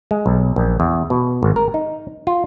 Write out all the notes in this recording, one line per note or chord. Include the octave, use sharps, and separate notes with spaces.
G#3
B1
A#1
E2
B2
G#1
A#4
D#4
F4